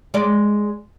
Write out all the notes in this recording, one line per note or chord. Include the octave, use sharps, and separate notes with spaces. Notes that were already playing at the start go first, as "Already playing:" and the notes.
G#3 D5